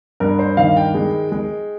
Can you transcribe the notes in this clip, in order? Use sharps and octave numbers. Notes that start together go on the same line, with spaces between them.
G2 A#4
C5
D#3 F5
G5
G#3
G#3